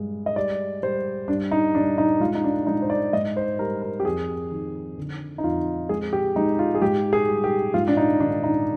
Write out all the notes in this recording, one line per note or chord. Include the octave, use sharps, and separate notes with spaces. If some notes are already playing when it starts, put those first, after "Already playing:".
Already playing: G2 G#3
D#5
G3 D5
G3 C5
G2 D4
D#4
G2 D4
D#4
G#3 F4
D#4
D4
G#3 D#4
C5
D5
G#2 D#5
C5
G3 A#4
A#4
G4
F2 G#4
D#3
D3
D#4
F2 F4
G#3 G#4
G4
G#3 D#4
F4
G#4
G#2 G4
G#4
G3
G4
G#2 F4
D4
D#4
D#3 D4
D#4